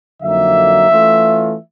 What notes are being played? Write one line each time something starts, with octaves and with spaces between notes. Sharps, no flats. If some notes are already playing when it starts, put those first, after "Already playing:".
F2 D3 F#3 A#3 D#4 E5
E3 A3 C#4 F4